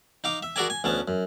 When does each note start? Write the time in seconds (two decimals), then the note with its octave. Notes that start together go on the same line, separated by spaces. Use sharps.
0.24 D#4 F5 D6
0.43 E5
0.56 F#4 G#4 A#4 D5 E5 G#5
0.70 G#5
0.84 D2 B3 C#4 A5
1.08 F#2